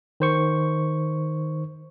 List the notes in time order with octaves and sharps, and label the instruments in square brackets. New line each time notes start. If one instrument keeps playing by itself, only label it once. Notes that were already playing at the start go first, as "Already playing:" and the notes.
[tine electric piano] D#3 C5 C#6